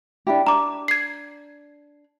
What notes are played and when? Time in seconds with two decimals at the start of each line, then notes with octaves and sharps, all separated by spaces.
0.27 D4 E4 G4
0.47 D4 A#5 D6
0.88 G#6 C7